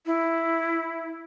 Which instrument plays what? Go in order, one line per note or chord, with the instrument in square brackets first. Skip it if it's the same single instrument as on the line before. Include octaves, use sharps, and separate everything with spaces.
[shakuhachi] E4